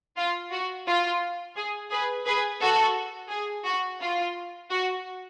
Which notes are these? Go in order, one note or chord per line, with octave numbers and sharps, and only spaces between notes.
F4
F#4
F4
G#4
G#4 B4
G#4 B4
F#4 A4
G#4
F#4
F4
F#4